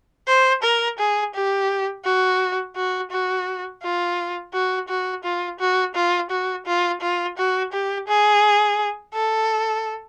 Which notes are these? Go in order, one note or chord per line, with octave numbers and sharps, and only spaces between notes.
C5
A#4
G#4
G4
F#4
F#4
F#4
F4
F#4
F#4
F4
F#4
F4
F#4
F4
F4
F#4
G4
G#4
A4